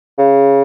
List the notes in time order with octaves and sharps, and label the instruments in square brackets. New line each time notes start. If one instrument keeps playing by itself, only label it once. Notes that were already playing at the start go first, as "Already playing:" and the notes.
[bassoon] C#3